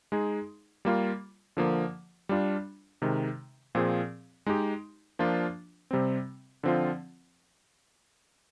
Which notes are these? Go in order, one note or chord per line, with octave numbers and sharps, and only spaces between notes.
G#3 D#4 G#4
G3 A#3 F4
D3 F3 A#3
G3 D4 F4
C3 D#3 G#3
A#2 F3 C4 F4 G#4
G#3 D#4 G4
F3 A#3 D4 F4
C3 G3 C4
D3 F3 C4 F4